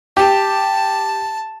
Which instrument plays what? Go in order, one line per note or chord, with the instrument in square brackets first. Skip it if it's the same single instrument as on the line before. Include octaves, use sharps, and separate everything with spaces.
[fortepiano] G4 [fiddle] A5